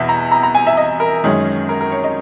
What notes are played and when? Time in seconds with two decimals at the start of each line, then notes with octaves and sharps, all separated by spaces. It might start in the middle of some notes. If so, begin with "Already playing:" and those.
Already playing: E2 B2 E5
0.09 A#5
0.32 A#5
0.43 A#5
0.55 G#5
0.67 E5
0.77 D#5
1.00 A#4
1.24 F#2 D#3 G#3 C#4 G#4
1.69 A#4
1.81 A#4
1.91 C#5
2.04 D#5